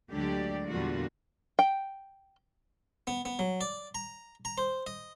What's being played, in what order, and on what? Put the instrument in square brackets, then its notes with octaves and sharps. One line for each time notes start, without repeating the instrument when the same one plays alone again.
[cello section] D2 D3 F#3 G#3 G4 D5
E2 A#2 D3 G3 F4 F#4
[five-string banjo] G5
[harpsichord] B3
B3
F#3
D5
A#5
A#5
C5
D#5